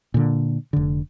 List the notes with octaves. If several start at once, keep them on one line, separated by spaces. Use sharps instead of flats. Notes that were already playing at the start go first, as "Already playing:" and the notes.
A#2 D3
F1 D3